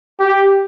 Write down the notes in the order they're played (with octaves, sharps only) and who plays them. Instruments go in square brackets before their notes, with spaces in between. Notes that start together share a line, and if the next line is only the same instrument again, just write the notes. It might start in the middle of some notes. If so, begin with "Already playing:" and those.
[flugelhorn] G4